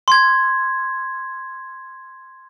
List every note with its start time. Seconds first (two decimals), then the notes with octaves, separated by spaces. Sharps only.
0.08 C6 G#6